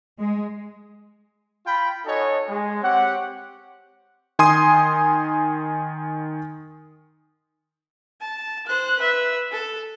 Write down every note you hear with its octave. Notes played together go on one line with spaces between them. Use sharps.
G#3
F4 G5 B5
D#4 F#4 A4 C#5 D#5 G#5
G#3
C4 G4 C#5 F#5
D#3 G#5 C6 D#6 D#7
A5
C5 F#6
B4 E5
A4